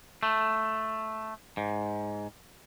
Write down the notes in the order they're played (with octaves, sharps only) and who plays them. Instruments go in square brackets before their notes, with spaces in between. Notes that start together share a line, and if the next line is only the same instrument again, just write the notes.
[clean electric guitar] A3
G#2